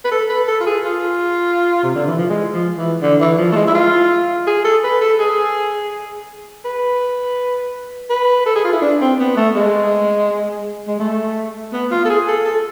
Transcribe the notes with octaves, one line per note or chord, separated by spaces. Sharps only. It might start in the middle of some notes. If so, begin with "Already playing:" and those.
B4
A4
B4
A4
F4
G#4
F4
C3
D3
E3
F3
G#3
F3
E3
D3
E3
F3
A3
G#3
E4
F4
G#4
A4
B4
A4
G#4
B4
B4
A4
G#4
F4
E4
D4
C4
B3
A3
G#3
G#3
A3
B3
F4
A4
G#4
A4
A4